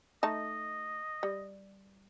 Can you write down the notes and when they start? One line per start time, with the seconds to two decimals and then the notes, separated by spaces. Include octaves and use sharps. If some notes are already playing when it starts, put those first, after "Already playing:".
0.23 A3 D#4 D#5 A5
1.23 G3